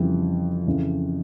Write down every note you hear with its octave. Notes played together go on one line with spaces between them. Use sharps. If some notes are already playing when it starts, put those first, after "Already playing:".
Already playing: F2 C#3 E3 G3
F2 C#3 E3